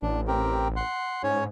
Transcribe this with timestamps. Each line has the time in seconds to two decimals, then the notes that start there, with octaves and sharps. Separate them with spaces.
0.02 A1 D4
0.27 C4 G4 A#4
0.76 F#5 C6
1.23 G#2 C#4 C#5